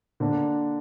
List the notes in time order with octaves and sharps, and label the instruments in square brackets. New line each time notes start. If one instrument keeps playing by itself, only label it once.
[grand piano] D3 A#3 D4 A#4